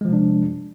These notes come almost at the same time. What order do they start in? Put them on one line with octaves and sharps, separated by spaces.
G#3 F3 C3 D4